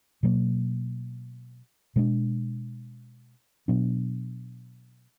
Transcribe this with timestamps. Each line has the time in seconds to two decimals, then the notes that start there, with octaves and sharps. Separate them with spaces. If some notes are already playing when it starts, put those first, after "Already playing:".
0.23 B2 F#3 A#3
1.96 B2 G#3 D4
3.68 B2 F#3 B3 D4